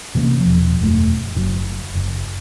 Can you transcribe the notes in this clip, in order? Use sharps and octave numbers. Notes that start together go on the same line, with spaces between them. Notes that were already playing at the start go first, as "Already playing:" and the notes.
C3 E3 A#3 C#4
E1 F3
E1 F#2 G3 A3
F#1 C#3 F#3
F#1